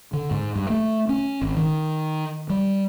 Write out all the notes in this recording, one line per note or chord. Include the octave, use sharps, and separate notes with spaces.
D3
G#2
G2
A3
C#4
G#1
D#3
G3